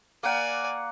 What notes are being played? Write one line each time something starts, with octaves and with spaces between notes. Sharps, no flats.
A#3 D5 F#5 G#5